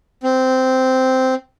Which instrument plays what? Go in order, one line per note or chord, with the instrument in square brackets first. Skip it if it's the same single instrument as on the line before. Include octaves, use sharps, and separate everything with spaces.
[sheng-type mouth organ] C4